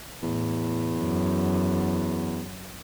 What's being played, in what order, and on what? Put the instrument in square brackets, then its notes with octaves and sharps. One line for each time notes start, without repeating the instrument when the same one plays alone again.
[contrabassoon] E2 [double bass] A2
[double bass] F#2